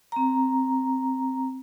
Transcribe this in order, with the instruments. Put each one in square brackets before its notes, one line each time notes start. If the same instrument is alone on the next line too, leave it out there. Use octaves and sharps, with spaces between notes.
[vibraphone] C4 A#5